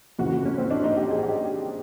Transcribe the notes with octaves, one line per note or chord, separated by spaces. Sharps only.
F2 C#3 E3 F#4
F#4
C#4
C4
D4
D#4
G4
G#4
G4